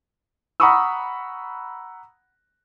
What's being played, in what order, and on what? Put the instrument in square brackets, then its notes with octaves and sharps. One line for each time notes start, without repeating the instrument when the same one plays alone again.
[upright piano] F#5 A#5 B5 C#6 D#6 E6